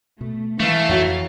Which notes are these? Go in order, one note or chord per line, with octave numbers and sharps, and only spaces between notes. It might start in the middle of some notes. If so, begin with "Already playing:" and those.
B2 A3
E3 G#3 A3 F5
F2 F#3 C#5